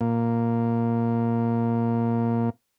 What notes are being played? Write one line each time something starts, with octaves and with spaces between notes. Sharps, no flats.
A#2 A#3